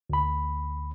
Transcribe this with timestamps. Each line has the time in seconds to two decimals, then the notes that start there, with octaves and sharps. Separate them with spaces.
0.10 D2 B5